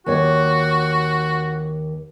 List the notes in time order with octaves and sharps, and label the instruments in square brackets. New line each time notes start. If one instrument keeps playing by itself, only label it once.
[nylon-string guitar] D#2 C#5 [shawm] F#4